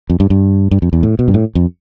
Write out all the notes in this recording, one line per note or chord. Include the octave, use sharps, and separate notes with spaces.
F2
G2
G2
G2
F2
E2
A2
B2
G2
A2
F2